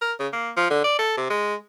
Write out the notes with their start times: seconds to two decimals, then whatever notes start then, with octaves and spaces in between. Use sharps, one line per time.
0.02 A#4
0.20 C#3
0.33 A#3
0.57 F3
0.70 D3
0.84 D5
0.99 A4
1.17 C3
1.30 G#3